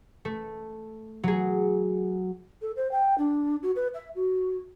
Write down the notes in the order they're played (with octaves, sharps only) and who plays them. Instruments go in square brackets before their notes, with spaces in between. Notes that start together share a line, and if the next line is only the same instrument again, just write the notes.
[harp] A3
F#3 G#4
[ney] A4
C5
G5
D4
F#4
B4
E5
F#4